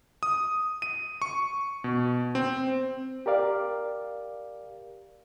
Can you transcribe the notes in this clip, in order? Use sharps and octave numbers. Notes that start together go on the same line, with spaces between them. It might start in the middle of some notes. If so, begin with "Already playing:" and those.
D#6
D#7
C#6
B2
C4
G4 A#4 D5 F5